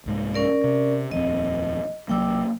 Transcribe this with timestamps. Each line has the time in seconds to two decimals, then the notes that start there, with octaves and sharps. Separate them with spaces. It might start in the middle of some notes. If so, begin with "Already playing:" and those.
0.06 C2 G#2 G#3
0.34 C#4 A#4 D5
0.64 C3
1.12 D#1 F2 C4 D#5
2.09 C2 F#3 A#3 G5 D6 E6